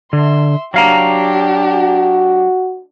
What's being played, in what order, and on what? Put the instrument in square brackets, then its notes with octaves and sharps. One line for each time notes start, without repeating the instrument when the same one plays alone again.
[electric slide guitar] D3 [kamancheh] E5 C6
[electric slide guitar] F#3 F5 A#5 [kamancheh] D4 G4
[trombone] F#4